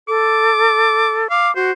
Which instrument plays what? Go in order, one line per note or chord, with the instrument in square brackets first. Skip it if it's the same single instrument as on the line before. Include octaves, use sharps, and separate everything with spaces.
[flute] A4 [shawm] D6
[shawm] F5 [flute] D6
[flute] F#4 [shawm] C5